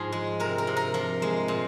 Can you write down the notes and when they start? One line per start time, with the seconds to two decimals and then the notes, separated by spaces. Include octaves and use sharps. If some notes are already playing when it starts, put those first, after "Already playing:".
Already playing: G#2 F3 F4 G#4
0.12 G#3
0.40 C3 A#4
0.58 A#4
0.67 C3
0.77 A#4
0.94 F3 A#4
1.22 G#3
1.48 A#2